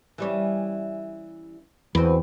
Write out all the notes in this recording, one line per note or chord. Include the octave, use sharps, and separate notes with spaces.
E3 G3 C#4
E2 C4 F#4 B4